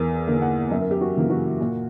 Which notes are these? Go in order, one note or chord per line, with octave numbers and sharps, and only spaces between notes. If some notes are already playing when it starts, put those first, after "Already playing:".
Already playing: E2 A#4
D3 A#3
F#5
F#2 E5
A#4
G4
F#4
C#3 E3 A#3
F#4
A#2